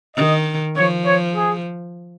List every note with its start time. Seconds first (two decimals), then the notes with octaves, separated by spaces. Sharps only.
0.16 D#3 D#5
0.76 F3 C#5
1.06 C#5
1.35 G#4